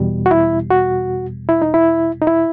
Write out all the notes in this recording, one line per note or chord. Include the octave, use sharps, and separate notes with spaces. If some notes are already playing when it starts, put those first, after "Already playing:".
Already playing: E2 B2 G3
F#4
E4
F#4
E4
D#4
E4
D#4
E4